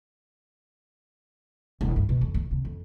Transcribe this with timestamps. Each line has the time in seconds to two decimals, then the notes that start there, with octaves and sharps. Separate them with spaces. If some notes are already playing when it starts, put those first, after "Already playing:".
1.81 E1
1.96 G2
2.09 B2
2.21 F2
2.34 A2
2.51 C3
2.65 F2